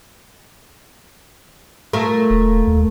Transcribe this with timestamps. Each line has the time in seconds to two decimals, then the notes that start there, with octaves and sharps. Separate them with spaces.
1.93 A#2 A3 A#4
2.30 D#1
2.67 D#2